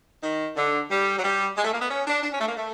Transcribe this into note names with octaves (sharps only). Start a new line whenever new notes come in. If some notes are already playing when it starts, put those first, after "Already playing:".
D#3
D3
G3
F#3
G3
G#3
A3
A#3
B3
C#4
D4
D4
C#4
A3
A#3
A3